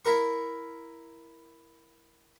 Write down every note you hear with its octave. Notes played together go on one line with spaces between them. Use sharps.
E4 A#4 C#6